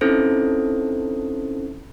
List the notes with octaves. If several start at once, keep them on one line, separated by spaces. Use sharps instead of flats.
C4 C#4 D#4 E4 A4 C5